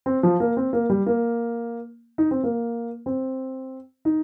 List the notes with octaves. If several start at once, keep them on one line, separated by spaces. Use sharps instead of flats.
C4
F3
A#3
C4
A#3
G3
A#3
D#4
C4
A#3
C4
D#4